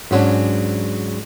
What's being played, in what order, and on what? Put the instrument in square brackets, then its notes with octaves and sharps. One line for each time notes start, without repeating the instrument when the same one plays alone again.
[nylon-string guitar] G#2 F#3 G#3 C#4 D4